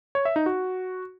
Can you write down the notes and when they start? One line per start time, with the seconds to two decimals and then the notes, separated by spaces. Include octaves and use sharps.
0.15 C#5
0.25 E5
0.36 D#4
0.46 F#4